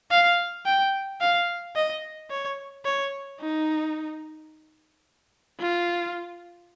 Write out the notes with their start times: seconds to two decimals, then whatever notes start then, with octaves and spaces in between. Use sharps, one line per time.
0.11 F5
0.66 G5
1.21 F5
1.76 D#5
2.30 C#5
2.85 C#5
3.40 D#4
5.60 F4